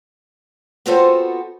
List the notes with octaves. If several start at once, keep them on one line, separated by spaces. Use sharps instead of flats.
B3 C4 F4 F#4 A4 C5